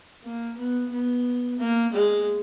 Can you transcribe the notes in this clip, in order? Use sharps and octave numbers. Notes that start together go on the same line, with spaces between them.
A#3
B3
B3
A#3
G#3